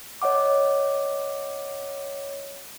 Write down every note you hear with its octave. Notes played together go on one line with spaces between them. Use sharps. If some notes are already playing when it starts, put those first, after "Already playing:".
C#5 D#5 F#5 D6